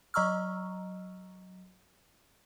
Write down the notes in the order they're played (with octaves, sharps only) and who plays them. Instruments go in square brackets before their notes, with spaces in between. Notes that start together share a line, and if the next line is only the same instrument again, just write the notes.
[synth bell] F#3 D#5 A#5 C#6 E6 F6